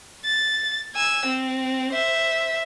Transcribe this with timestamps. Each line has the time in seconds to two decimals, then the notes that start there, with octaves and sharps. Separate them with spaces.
0.25 A6
0.95 G#5 E6
1.25 C4
1.93 C5 E5